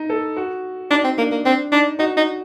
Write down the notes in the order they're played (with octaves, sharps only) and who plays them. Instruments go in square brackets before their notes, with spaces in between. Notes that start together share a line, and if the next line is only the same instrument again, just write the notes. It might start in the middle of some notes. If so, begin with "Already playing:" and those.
Already playing: [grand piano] D#4
A4
F#4
[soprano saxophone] D4 [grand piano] D#4
[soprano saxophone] C4
[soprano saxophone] A#3 [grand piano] D4
[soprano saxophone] A#3
[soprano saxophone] C4 [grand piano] D4
[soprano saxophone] D4 [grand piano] D#4
[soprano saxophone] D#4 [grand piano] F#4
[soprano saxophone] D#4